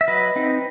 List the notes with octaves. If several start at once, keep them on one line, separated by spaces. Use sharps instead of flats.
E5
F#3 B4 D#5
C4 D#4